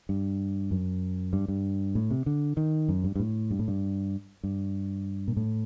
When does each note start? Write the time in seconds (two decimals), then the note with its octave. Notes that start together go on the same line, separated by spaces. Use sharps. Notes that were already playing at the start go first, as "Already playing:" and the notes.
0.09 G2
0.71 F#2
1.33 G2
1.48 G2
1.95 A2
2.10 C3
2.26 D3
2.57 D#3
2.89 F#2
3.04 G2
3.15 G2
3.20 A2
3.51 G2
3.59 A2
3.68 G2
4.43 G2
5.28 A#2
5.37 A2